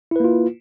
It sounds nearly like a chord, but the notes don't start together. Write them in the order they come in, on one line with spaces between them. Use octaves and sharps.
E4 B4 A#3 F4